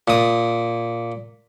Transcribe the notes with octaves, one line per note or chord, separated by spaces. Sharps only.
A#2 D#6